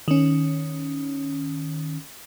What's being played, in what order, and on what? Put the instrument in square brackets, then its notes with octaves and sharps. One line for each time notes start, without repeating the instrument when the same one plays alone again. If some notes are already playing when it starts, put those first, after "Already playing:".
[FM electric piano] D#3 C#4